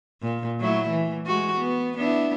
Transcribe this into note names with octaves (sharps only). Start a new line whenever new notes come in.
A#2
F#3 A3 E4
E3
G#3 F#4
B3
B3 D4 E4